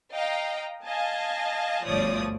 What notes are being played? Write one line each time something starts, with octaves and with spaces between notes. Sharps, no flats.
D#5 F5 G5 A#5
D#5 F5 G#5 A5
G1 D2 F3 C#5 D5 D#6